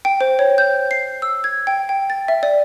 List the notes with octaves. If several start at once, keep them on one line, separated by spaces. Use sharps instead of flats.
G5
C5
C#5
G6
C7
E6
G#6
G5
G5
A6
E5
D5